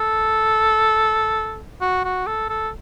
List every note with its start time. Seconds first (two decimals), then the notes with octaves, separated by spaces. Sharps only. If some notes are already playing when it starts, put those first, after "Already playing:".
Already playing: A4
1.81 F#4
2.04 F#4
2.27 A4
2.49 A4